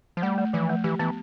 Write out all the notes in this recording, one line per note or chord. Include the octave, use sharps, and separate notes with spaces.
F3
G3 A3
A3
E3 F3
A3
E3 G4
E3 B3